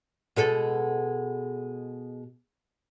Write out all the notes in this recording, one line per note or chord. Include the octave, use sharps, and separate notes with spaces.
B2 G#3 A4